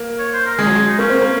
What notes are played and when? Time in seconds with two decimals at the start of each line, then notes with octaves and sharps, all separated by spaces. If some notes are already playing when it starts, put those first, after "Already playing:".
Already playing: A#3
0.19 C#5
0.33 C5
0.46 A#4
0.59 G#3 G#4
0.66 F#3
0.75 G#3
0.88 D#4
0.99 A#3 C#4
1.10 C4
1.21 A#3